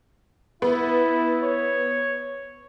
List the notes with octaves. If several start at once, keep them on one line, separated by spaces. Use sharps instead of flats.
B3 E4
C#5